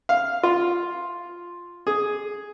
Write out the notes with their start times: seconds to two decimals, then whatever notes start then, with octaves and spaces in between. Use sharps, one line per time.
0.09 F5
0.43 F4
1.87 G#4